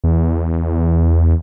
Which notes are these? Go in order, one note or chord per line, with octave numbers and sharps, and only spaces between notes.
E2